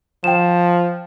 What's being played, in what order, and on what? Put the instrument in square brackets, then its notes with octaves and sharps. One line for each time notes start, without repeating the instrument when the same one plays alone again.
[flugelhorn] F3 [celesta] G5 E7